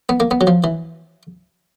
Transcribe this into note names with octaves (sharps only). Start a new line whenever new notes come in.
B3
A#3
B3
F#3
F3
E3